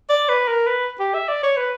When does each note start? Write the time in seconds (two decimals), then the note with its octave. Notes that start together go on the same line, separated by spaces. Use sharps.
0.10 D5
0.29 B4
0.48 A#4
0.67 B4
1.00 G4
1.14 E5
1.29 D5
1.43 C#5
1.57 B4